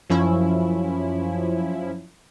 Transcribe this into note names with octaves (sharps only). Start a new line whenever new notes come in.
F#2 F3 C#4 E4